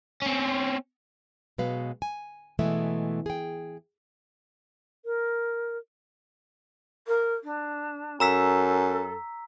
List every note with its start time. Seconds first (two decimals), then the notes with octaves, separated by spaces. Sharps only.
0.22 C4 C#4
1.58 B2 F#3 G#3 B4 F5
2.02 G#5
2.59 B2 E3 G#3 A3 B3 E5
3.26 G#4 G5
5.05 A#4
7.07 A#4
7.43 D4
8.20 F#2 A4 A#5 E6 B6